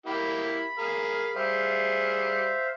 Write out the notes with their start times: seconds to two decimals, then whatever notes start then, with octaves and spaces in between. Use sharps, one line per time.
0.06 A#3 E4 G4 B5
0.78 G#4 A#4 F5
1.35 G3 G#4 C5 E5 F5